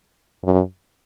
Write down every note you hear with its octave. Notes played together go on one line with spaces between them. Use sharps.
F#2